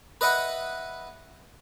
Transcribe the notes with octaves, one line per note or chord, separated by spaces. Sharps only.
B4 D#5 E5 F#5 B5